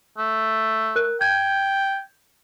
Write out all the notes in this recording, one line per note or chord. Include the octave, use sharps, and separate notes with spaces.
A3
A#4 F#6
G5 G6 G#6